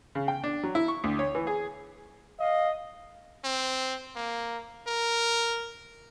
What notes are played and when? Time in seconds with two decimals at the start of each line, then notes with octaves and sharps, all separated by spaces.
0.15 C#3
0.28 G5
0.44 D4
0.63 F#3
0.75 E4
0.88 C#6
1.04 D2
1.19 C#5
1.35 E3
1.47 G#4
2.40 D#5 F5
3.44 C4
4.16 A#3
4.87 A#4